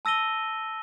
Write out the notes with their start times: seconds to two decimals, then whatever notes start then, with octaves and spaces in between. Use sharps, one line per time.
0.05 A5 E6 A#6 D#7 G7